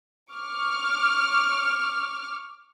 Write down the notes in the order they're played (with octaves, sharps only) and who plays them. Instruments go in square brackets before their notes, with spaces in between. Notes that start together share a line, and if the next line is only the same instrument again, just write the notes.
[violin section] C#6 D6 F6